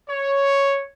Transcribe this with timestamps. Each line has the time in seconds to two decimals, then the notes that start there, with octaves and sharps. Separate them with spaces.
0.09 C#5